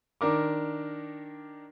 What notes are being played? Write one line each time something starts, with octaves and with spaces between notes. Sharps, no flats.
D#3 D4 A#4 D6